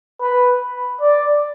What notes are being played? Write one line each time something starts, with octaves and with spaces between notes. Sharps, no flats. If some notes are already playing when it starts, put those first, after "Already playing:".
B4
D5